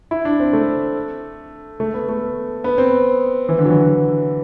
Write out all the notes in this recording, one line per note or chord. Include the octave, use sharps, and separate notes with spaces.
E4
D4
C4
A3
A3
B3
A3
B3
C4
E3
D3
F#3
E3
F#3